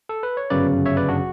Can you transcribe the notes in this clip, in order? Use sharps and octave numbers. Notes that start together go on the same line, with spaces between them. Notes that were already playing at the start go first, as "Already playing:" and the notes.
A4
B4
C#5
G1 F#2 C#3 F#3 B4 D5
C#5 E5
B4 D5
D4 F#4